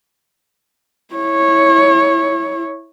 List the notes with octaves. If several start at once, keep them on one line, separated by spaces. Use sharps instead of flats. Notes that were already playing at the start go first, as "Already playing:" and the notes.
E4 C#5